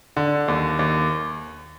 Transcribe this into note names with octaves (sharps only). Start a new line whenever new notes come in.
D3
D#2
D#2